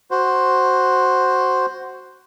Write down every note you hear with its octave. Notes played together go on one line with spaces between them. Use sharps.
F#4 C5